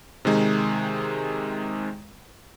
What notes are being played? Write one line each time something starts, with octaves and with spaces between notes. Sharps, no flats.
C3 D#3 G#3 D#4